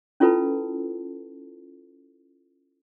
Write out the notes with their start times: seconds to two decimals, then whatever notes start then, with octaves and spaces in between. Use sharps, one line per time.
0.20 C#4 E4 F4 A4 B4 A5